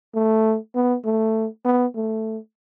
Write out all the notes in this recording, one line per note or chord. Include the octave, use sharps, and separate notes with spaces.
A3
B3
A3
B3
A3